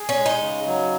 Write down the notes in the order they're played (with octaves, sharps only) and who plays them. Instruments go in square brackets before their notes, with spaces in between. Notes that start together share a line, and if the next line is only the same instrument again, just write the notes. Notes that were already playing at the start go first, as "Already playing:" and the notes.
Already playing: [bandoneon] G#4
[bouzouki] C#4
[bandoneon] G#3
[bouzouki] D#4
[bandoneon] C#3
F#3